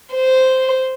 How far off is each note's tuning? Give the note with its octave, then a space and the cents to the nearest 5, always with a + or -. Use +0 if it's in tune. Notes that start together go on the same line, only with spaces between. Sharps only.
C5 -10